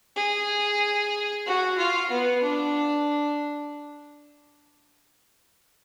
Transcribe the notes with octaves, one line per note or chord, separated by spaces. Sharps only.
G#4
F#4
F4
B3
D4